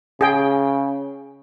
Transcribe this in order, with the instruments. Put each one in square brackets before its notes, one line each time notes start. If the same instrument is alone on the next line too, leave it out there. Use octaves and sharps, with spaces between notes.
[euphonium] C#3 [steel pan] G#4 G5